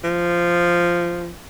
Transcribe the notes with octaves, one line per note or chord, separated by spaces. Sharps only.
F3